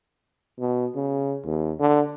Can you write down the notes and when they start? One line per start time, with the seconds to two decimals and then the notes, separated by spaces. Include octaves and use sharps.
0.59 B2
0.95 C#3
1.45 D#2
1.79 D3